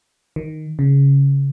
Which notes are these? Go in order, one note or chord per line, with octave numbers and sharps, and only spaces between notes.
D#3
C#3